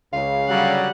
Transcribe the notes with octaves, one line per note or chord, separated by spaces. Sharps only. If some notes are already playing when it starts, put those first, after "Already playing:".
C#2 C#3 F5
D3 F#3 G3 F#5